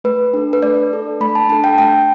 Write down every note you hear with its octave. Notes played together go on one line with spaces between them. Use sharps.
A3 B4
D4 A4
B4
A3 D5
D4 A4
A3 B5
A5
D4 A4 A5
G5
A3 G5